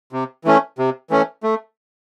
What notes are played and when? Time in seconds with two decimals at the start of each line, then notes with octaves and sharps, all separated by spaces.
0.12 C3
0.44 E3 A3 C#4
0.78 C3
1.10 E3 A3 C#4
1.43 A3